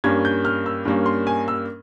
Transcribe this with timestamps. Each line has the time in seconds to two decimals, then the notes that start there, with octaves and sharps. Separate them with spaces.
0.04 G2 G3 A#3 C#4 G#6
0.25 G6
0.45 F6
0.66 E6
0.85 G2 G3 A#3 C#4
1.06 C6
1.27 G#5
1.48 E6